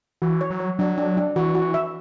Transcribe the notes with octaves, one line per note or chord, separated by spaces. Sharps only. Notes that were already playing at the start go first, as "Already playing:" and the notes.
E3 F#4
C#5
F#3
C#5
F#3 D4
D4
D4
E3 F#4
F#4
E5